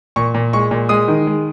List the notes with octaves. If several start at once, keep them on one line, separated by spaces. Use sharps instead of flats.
A#2 C#6
A#2
G#3 C#6
A#2
G#3 D#6
D#3
G#3